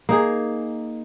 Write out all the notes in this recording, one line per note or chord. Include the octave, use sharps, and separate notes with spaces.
A#3 D#4 G#4